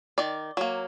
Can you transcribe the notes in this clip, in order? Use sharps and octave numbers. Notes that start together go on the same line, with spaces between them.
D#3 D5
F#3 A#3